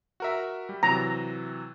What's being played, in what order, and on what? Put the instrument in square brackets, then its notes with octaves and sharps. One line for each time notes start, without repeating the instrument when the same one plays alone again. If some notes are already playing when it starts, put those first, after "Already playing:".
[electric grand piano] F#4 A#4 E5
G3
[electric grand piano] C3 E3 F#3 [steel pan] A#5